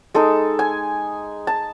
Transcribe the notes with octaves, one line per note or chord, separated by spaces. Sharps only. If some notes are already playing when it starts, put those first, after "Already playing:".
G#3 D#4 A4
G#5
A5